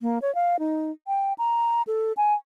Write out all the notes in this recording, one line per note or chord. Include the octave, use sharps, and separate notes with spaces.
A#3
C#5
F5
D#4
G5
A#5
A4
G#5